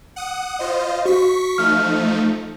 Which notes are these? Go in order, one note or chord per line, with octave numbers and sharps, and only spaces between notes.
F#5 D#6
F4 C5 D#5
F#4 C#6 B6
F3 A3 D#4 F6